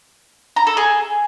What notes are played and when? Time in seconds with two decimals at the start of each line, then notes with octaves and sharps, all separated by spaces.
0.56 A#5
0.67 A4
0.77 G#4